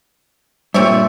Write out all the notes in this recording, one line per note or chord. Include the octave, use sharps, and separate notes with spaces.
G2 A#2 C4 C#5 E5